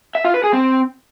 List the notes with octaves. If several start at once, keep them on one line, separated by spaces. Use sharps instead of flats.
E5
F4
B4
G#4
C4